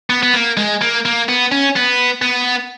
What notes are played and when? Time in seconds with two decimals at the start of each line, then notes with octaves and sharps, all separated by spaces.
0.10 B3
0.23 B3
0.34 A#3
0.57 G#3
0.81 A#3
1.05 A#3
1.28 B3
1.52 C#4
1.76 B3
2.22 B3